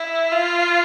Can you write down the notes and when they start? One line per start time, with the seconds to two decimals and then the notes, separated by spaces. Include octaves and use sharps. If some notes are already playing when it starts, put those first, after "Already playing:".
Already playing: E4
0.31 F4